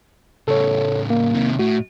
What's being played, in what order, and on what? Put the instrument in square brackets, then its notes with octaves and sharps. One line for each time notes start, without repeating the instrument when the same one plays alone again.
[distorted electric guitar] A2 C#3 [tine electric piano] A4 C#5
[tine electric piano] A#3
[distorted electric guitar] C3 D#3
[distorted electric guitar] A2 [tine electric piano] F#4